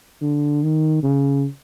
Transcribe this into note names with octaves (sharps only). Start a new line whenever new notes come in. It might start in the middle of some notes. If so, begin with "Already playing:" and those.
D3
D#3
C#3